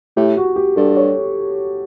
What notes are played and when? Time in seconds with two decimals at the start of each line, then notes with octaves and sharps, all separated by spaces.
0.17 A2 G4
0.37 F#4
0.56 G4
0.76 G2 A4
0.97 C#5